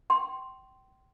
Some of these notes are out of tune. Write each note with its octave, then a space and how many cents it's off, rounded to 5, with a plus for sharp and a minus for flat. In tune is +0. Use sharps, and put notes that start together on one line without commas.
G5 -30 C6 +0